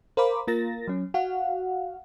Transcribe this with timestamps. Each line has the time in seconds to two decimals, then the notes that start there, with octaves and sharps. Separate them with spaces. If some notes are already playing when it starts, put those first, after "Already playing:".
0.17 A#4 C5 F5 B5 D6
0.47 A#3 F4 A#4 A6 A#6
0.87 F#3 C#4
1.14 F#4 F5 F#5